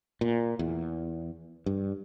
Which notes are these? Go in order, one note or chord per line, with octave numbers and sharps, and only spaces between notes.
A#2
E2
G2